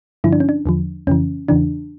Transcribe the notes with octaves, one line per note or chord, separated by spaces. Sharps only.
G2 D3 F3 E4
D4
C#4
D4
E2 D3 F3
F2 C#3 E3 C#4
E2 C#3 E3 D4